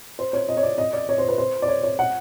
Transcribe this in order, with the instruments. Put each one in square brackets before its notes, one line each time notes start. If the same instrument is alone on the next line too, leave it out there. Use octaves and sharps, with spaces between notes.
[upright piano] C5
C#5
D#5
C#5
D5
D#5
D5
C#5
C5
B4
C5
D5
C#5
C#5
F#5